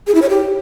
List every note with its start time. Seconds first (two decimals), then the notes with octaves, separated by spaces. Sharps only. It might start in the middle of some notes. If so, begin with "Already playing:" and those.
0.07 G#4
0.15 E4
0.22 C#5
0.29 G4